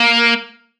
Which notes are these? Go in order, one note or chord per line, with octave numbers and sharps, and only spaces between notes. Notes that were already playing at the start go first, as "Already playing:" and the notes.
Already playing: A#3